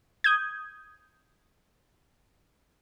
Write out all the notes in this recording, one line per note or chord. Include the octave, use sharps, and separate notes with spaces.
D#6 G6 G#6